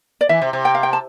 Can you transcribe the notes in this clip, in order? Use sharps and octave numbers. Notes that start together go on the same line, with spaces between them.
D5
E3 E5
C3
C3
G5
F5
G5
A5